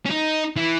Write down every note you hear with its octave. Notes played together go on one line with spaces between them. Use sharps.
C#4
D#4
E3